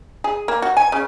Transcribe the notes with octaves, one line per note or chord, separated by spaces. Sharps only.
G#4
A#3
F#4
G#5
C#3